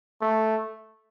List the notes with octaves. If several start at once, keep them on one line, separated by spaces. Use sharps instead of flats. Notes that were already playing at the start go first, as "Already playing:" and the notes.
A3